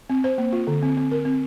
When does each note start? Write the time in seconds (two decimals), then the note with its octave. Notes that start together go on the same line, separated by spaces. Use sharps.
0.10 C4
0.24 C5
0.38 A#3
0.53 F4
0.67 D3
0.83 C4
0.97 C4
1.12 A#4
1.25 C4